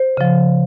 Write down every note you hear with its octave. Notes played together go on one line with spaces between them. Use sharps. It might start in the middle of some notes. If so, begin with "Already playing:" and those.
Already playing: C5
C#3 F3